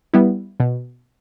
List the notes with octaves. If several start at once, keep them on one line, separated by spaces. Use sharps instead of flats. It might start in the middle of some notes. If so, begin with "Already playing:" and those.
G3 B3 E4
B2